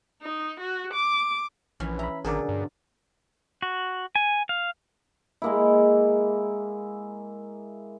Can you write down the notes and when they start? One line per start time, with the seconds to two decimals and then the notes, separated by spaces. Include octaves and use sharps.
0.22 D#4
0.60 F#4
0.93 D6
1.80 A#1 E3 C#4
1.99 E5 A#5 B5
2.25 G#1 B2 D3 F#3 G#4 A#4 D5
2.49 G2
3.62 F#4
4.15 G#5
4.49 F5
5.42 G#3 A#3 E4